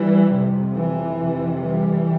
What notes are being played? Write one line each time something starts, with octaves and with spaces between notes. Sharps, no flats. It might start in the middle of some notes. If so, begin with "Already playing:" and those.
Already playing: G2 E3 G3
F2 C3
E3
F2 C3
E3 G3